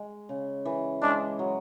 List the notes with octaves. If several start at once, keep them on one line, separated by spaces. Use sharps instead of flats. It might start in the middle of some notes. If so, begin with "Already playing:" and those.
Already playing: G#3
C#3
E3
G#3 D4
F#3